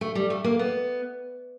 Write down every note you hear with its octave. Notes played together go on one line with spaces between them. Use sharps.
A3
G3
A3
A#3
B3